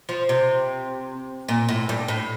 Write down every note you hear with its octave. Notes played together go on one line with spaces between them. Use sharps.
F3
C3
A#2
A2
G2
A2